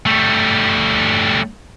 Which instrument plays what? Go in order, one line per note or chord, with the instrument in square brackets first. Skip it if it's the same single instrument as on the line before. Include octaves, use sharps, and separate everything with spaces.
[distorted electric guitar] G3 A3